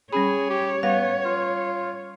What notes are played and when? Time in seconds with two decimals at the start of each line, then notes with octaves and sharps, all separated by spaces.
0.13 G3 C#4 G#4 C#5 B5
0.50 G4
0.83 G3 B3 F5
1.25 F4